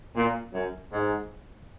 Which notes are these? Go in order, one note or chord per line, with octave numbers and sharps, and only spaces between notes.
A#2
F#2
G#2